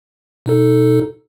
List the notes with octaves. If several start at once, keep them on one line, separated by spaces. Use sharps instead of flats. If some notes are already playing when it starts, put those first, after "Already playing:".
B2 D#4 A4